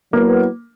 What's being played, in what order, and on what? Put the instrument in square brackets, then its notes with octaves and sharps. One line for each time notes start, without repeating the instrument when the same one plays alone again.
[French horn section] F#3 B3 E4 B4 [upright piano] A#3